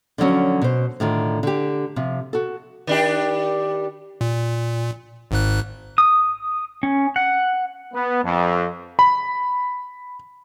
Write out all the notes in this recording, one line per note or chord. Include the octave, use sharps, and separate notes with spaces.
D3 F3 F#3 C#4
B2 C5
A2 D3 D#3 F4
D3 G4
C3 F3
F#4 A4
D#3 D4 G4
A#2
G#1 G#2 F#6
D#6
C#4
F#5
B3
F2
B5